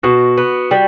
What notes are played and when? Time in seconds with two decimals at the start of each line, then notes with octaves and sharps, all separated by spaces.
0.03 B2 F#4
0.37 B3
0.71 G3